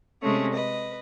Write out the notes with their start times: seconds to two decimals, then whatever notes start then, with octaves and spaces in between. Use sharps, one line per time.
0.22 C3 G#3 A3 C#4
0.54 B4 D#5